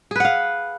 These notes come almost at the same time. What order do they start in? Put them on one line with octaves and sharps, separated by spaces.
G#4 B4 F#5 F5